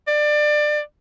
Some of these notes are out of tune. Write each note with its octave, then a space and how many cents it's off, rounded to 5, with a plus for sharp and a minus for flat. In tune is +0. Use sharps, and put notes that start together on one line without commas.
D5 +25